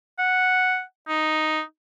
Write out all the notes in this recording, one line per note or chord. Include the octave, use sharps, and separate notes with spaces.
F#5
D#4